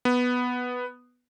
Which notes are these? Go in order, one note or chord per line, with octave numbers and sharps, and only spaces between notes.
B3